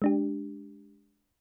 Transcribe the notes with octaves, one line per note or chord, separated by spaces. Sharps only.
G#3 D4 G4